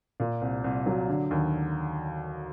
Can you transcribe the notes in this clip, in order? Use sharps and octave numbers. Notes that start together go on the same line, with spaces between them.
A#2
C2
C2
F#3
D3
D#2